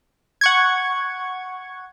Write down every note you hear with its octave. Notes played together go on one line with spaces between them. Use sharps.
F#5 C#6 G#6